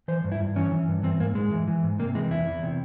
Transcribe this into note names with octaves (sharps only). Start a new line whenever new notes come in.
E3 C5
G2
E4
G2
E3 C#4
E3
G2
E3 C4
G#2 A#3
G#2 G#3
E3
E3
G#2
C3 A#3
E3 G#3
E2 E4
E2
C3